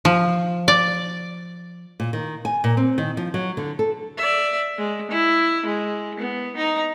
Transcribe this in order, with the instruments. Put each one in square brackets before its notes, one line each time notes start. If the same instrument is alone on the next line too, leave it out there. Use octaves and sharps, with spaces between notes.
[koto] F3
D5
[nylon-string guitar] A#2
D#3
G#5
A#2
C4
D#3
F3
F#3
D3
A4
[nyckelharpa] D5 E5
G#3
E4
G#3
B3
D#4 A#5